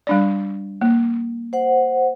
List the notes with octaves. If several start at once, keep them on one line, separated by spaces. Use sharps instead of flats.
G3 D4 D5
A#3
C5 F#5